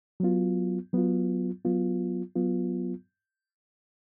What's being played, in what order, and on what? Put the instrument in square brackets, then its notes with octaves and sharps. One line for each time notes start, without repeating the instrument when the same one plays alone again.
[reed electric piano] F#3 B3 F4
F#3 B3 F4
F#3 B3 F4
F#3 B3 F4